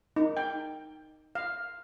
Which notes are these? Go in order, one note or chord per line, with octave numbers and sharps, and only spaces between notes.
D#4
G5
F5